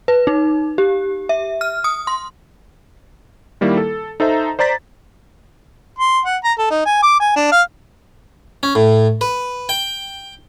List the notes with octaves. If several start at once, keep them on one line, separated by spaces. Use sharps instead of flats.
B4
D#4
G4
E5
F6
D#6
C6
D#3 G3 A#3 E4
A4
D#4 A4 C5 E5 A#5
C5 D5 A#5 A6 B6
C6
F#5
A#5
A4
D#4
G#5
D6
G#5
D4
F5
C#4
A2
B4
G5